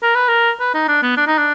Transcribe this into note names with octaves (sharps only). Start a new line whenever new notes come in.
A#4
B4
A#4
B4
D#4
D4
B3
D4
D#4
D4